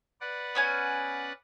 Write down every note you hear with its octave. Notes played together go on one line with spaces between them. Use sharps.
B4 D5 F#5
B3 C#4 G#5